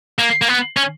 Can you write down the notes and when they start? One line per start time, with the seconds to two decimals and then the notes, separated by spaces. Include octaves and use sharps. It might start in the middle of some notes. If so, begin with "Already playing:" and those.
0.19 A#3
0.42 A#3
0.48 B3
0.77 C#4